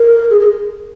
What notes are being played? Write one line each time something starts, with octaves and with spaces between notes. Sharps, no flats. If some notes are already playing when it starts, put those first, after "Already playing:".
Already playing: A#4
G#4
G#4